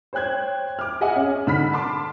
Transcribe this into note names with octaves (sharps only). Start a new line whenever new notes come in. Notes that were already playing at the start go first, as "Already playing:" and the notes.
C5 C#5 G5 F#6 G#6
D6 F6
G#4 D#5 E5 F#5 G#5
C#4
D3 D#4 B5 F6 B6
A5 C6 D6